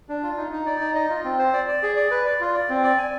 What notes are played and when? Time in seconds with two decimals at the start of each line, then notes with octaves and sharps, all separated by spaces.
0.09 D4
0.23 F4
0.37 D#4
0.52 D#4
0.66 D5
0.81 D#4
0.95 D#5
1.10 F4
1.24 C4
1.39 C5
1.53 D5
1.68 D5
1.83 G#4
1.96 D5
2.11 B4
2.25 D5
2.40 F4
2.54 D5
2.69 C4
2.84 D5
2.98 G#5